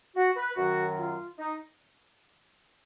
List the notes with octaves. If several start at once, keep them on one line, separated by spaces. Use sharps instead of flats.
F#4
B4
F#2 D#3 F#3 F#4
F4
D#4